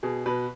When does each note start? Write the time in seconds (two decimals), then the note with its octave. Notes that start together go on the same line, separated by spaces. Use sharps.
0.03 B2 G#4
0.26 B2 B4